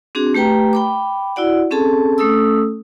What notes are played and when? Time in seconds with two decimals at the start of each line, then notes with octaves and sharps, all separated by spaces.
0.15 C4 D4 F#4 G#4
0.34 A3 G4 B4 G5 A#5
0.73 G5 B5 D6
1.36 E4 F#4 D5 F#5
1.71 C4 C#4 G#4 A4 A5
2.18 A3 C#4 A4 D#6 E6